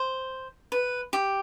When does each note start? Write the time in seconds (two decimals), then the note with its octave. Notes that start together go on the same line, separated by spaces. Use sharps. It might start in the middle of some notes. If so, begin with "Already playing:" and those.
Already playing: C5
0.72 B4
1.13 G4